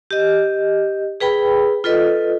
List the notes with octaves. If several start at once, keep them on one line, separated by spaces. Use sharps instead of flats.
G4 D#5
G#4 B4 G5 B5
F4 A4 B4 D#5